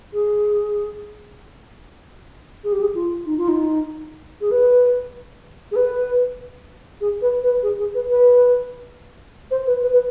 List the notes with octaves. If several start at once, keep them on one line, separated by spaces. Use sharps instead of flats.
G#4
G#4
G4
G#4
F4
D#4
F4
D#4
G#4
B4
G#4
B4
G#4
B4
B4
G#4
G#4
B4
B4
C5
B4
B4
B4